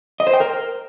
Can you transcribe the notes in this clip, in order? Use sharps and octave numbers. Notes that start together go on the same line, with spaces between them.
D#5
C5
G5
A#4